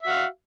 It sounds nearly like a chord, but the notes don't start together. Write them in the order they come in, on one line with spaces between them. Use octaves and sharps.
E5 F#4 F5